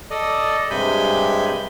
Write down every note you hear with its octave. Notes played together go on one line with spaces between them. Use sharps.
A4 D5 D#5
G2 C3 G#3 G#5 B5 G6